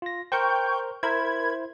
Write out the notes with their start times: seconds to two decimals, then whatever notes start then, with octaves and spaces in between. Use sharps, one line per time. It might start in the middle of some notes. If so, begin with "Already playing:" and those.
0.02 F4 A#6
0.32 A#4 C5 G5 C#6 G6
1.03 E4 A#4 C5 B5 G#6